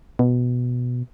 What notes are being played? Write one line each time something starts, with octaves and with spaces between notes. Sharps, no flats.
B2